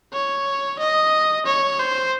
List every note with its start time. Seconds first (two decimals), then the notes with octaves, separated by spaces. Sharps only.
0.13 C#5
0.79 D#5
1.46 C#5
1.79 C5